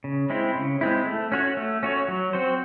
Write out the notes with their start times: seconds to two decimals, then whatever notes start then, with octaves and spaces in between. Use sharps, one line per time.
0.04 C#3
0.30 G#3 C4 E4
0.55 C#3
0.81 G#3 C4 E4
1.06 A3
1.32 C#4 F#4 C#5
1.57 A3
1.83 C#4 F#4 C#5
2.08 F#3
2.33 C4 F#4 C5